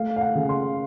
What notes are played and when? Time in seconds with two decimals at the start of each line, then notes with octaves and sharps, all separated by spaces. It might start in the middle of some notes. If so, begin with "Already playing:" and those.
Already playing: A3 F5
0.16 F5
0.21 F#5
0.35 C#3
0.49 C6